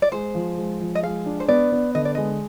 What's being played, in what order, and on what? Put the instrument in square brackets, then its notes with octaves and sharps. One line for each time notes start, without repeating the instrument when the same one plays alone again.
[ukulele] D5
[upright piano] G#3 [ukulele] C5
[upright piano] F3
G#3
F3
[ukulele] D#5
[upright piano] G#3 [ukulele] F5
[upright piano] D4
[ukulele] C5
[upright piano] B3 [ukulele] D5
[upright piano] B3
[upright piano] D3 [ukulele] D#5
[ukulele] D5
[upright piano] G#3 [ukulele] D#5